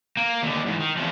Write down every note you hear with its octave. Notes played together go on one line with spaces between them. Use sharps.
A#3
D#2 D3
E2 G#2
D#3
E2 F3